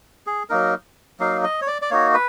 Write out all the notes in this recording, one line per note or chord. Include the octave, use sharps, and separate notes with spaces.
G#4
F#3 A#3 D#4 A#4
F#3 A#3 D#4 F5
D#5
C#5
D5
D5
A#3 D#4 F#4 C#5
B4